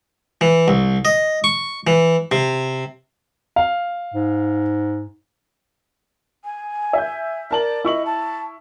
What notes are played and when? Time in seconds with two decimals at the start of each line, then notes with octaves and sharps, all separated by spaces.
0.41 E3
0.68 C2
1.05 D#5
1.44 C#6
1.87 E3
2.32 C3
3.56 F5
4.14 G#2
6.45 G#5
6.93 E5 G6
7.51 A#4 D5 A5 F#7
7.85 E4 D#5 C#6 F#7
8.06 A5